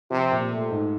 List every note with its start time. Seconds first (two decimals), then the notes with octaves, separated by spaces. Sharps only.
0.10 C3 F3
0.31 A#2
0.51 A3
0.71 G#2